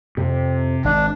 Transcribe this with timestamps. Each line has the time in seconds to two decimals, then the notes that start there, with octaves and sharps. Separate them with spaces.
0.17 F2 C3
0.85 G#1 D4